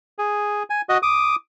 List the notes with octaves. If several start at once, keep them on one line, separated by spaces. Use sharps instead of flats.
G#4
G#5
F#4 D#5
D6 D#6